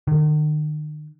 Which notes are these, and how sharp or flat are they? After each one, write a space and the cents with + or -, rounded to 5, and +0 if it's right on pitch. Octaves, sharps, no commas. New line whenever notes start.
D#3 -40